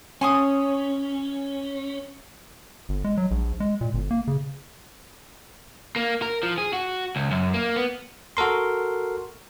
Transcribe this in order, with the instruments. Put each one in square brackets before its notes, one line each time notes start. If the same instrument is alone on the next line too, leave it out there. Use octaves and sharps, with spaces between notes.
[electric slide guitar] C#4 [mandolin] G#5 C6 D#6
[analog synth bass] G1
G#3
F#3
A#1
G#3
A#2
G1
A#3
C#3
[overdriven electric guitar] A#3
A#4
F3
G#4
F#4
C#2
F#2
A#3
B3
[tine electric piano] F#4 A4 A#4 C6